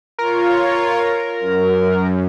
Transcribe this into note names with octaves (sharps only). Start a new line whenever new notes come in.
F4 A#4 C#5
F#2